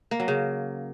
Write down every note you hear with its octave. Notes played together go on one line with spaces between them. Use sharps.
A#3
F#3
C#3